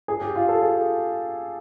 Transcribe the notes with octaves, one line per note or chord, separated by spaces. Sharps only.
G#4
G4
F4
A4
G#4